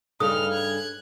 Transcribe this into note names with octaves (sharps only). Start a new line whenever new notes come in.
G2 C#3 D#4 A4 D#6 F6
F#6 G#6